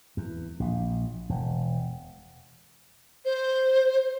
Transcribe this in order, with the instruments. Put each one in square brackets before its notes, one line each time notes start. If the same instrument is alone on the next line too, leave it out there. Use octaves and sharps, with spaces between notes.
[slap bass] E2
A#1
E1
[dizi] C5